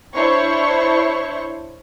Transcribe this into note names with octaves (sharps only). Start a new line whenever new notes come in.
D4 E4 C5 C#5 C#6